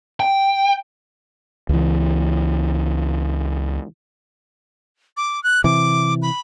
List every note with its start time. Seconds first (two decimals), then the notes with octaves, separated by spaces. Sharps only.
0.20 G5
1.69 C#2 E3
5.17 D6
5.44 F#6
5.64 C3 E3 D6
6.22 B5